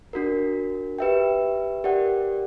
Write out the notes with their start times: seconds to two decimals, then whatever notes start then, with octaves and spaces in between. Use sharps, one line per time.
0.13 D4 F#4 A#4
0.99 G4 B4 E5 G5
1.84 G4 A#4 D5 F#5